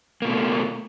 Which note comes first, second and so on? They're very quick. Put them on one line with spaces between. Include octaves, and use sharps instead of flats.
A#3 B2 A3